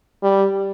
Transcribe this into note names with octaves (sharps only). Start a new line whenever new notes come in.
G3